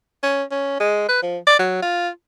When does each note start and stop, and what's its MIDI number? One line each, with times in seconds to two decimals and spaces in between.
0.23 0.43 61
0.51 0.77 61
0.80 1.05 56
1.08 1.18 71
1.23 1.38 53
1.47 1.58 74
1.59 1.79 54
1.82 2.09 65